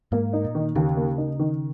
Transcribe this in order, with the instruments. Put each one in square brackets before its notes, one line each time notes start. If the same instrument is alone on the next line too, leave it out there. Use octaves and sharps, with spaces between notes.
[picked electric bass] G#2 [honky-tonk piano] A#3
[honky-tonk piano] D#4
[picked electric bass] A#2
[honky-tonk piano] D#3
[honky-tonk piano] D#2 [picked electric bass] C#3
[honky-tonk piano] A#3
D#4
D#3